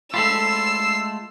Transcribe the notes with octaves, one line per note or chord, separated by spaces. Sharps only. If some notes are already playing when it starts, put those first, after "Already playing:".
G#3 A3 F4 A4 B5 E6 C7